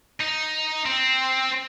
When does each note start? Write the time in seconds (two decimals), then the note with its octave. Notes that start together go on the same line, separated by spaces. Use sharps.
0.20 D#4
0.86 C4